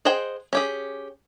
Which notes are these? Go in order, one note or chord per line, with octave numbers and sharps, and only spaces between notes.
G#4 C5 D#5 F#5 G5
C#4 G4 G#4